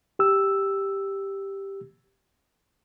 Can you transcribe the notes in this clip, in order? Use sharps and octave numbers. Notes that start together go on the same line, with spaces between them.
G4 E6